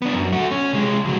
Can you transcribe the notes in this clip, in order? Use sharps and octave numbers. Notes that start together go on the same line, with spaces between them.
B3 D4
F#2
A3 F#4
C#4
C3 G#3
C#2 F#3